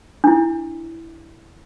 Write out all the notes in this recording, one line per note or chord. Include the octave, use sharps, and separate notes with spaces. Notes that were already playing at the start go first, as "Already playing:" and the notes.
D4 E4